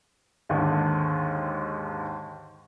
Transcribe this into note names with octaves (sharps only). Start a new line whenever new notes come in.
D#2 G#2 D3 D#3